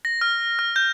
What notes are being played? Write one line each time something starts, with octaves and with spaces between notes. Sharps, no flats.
A#6
F6
F6
G6